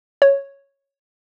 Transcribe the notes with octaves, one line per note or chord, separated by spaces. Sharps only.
C#5